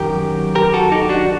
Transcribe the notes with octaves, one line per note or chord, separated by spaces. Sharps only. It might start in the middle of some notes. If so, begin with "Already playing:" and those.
Already playing: F#2 D#3 G4 A#4
G4 A#4
F#4 A4
D#4 G4
D4 F#4